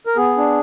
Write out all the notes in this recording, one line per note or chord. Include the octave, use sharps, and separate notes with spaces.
A#4
B3 G#4
D4